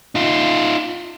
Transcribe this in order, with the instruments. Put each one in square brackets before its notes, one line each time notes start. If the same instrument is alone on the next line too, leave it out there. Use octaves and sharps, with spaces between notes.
[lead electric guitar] D#4 F4